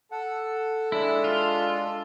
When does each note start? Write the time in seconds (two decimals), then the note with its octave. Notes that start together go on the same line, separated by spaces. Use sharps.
0.11 A4 F#5
0.92 G#3 D4 E4
1.24 F4